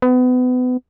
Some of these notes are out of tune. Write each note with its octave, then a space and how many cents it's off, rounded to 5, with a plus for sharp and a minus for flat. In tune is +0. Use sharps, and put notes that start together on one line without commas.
B3 +30